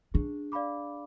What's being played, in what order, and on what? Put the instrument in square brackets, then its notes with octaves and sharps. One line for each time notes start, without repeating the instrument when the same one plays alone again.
[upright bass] D4 [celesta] G#4
[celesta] D5 F5 B5 D6